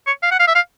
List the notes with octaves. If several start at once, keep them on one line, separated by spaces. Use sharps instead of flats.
C#5
F5
F#5
F5
E5
F5